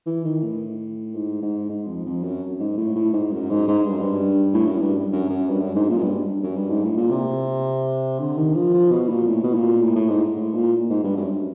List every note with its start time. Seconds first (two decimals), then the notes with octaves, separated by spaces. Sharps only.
0.06 E3
0.25 D#3
0.43 A2
1.15 G#2
1.42 G#2
1.69 G#2
1.87 F2
2.05 F2
2.23 F#2
2.59 G#2
2.78 A2
2.96 A2
3.13 G#2
3.32 F#2
3.50 G#2
3.68 G#2
3.85 G2
3.93 F#2
4.00 G2
4.53 A2
4.67 F#2
4.81 G2
5.12 F#2
5.30 F#2
5.48 G2
5.62 F#2
5.75 G#2
5.89 A#2
5.97 F#2
6.02 G2
6.43 F#2
6.56 G2
6.70 G#2
6.84 A2
6.97 A#2
7.11 C3
8.19 D3
8.37 D#3
8.55 F3
8.73 F3
8.91 B2
9.09 A#2
9.27 A2
9.43 B2
9.54 A#2
9.81 A2
9.95 A2
10.09 G#2
10.36 A2
10.54 A#2
10.90 G#2
11.04 G2
11.17 F#2